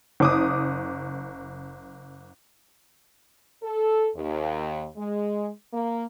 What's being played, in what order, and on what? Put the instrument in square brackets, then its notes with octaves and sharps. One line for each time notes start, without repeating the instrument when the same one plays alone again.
[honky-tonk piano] F#1 D6 D#6
[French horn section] A4
D#2
G#3
A#3